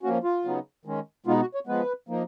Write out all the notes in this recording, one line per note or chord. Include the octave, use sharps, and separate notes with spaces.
F3 A#3 C#4 F#4
F4
C#3 F#3 B3 D#4
D#3 G#3 C#4
B2 G#3 B3 D#4 F4
F#4
C#5
F3 G#3 B3 B4
F3 A#3 D#4